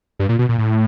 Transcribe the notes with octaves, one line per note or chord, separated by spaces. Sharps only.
G2
A#2
B2
A#2
A2